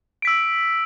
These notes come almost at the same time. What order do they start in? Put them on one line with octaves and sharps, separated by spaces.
D7 B6 E6